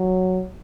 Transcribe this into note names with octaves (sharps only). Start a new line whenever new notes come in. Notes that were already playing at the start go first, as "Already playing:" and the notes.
Already playing: F#3